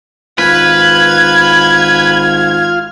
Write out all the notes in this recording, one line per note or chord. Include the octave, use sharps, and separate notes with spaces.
G#1 F4 B4 F6 G#6